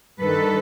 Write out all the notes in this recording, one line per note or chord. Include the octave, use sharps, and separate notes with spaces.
G2 D#3 G3 A4 B4